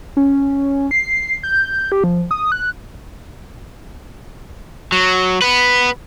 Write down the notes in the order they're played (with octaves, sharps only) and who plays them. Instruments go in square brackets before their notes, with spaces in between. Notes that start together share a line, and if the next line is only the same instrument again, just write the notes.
[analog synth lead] C#4
C7
G6
G4
F3
D#6
F#6
[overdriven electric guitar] F#3
B3 B4